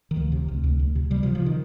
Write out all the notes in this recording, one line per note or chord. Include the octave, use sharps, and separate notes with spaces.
D#3
D2 F3
C3
D2
D2
D2
C3
C3 G3
F3
C3
F3
C3 D#3